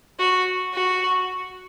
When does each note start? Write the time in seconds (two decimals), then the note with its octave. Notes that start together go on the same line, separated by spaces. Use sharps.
0.19 F#4
0.74 F#4